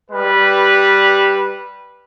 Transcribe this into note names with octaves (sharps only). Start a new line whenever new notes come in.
G3 B4